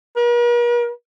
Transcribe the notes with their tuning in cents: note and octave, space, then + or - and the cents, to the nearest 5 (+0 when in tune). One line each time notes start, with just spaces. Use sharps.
A#4 +45